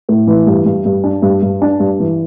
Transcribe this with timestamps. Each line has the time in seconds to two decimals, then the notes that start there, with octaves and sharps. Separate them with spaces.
0.09 A2
0.27 E3
0.47 G2
0.66 G2
0.85 G2
1.04 D4
1.22 G2
1.42 G2
1.62 D4
1.80 G2
2.00 E3